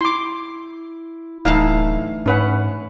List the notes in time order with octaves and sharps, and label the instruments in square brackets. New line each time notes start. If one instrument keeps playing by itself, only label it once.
[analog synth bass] E4 [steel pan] C6 D6
[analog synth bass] D1 [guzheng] D3 E3 A3 [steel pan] D#4 E4 F5
[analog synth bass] G#2 [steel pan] C#4 B4 F#5